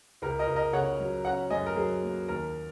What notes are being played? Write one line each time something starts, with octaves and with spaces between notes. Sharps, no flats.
C#2 A#4
A#4 D#5
C#2
A#4 D#5
C#3 C#5 F#5
F#3
C#4 F#5 A#5
F#2 D#5 G#5
A#4
F#3 G#4
A#3
D#2 A#4